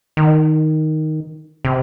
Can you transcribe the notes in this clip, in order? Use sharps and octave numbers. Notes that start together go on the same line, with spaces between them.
D#3
C3